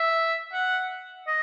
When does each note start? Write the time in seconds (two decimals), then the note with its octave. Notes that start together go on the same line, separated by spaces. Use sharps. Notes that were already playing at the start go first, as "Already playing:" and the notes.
Already playing: E5
0.53 F#5
1.27 D#5